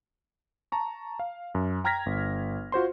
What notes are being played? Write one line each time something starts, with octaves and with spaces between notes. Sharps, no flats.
A5 A#5 C#6
F5
F#2
G5 A#5 F6 G#6 A#6 B6
G1
F4 F#4 C5 C6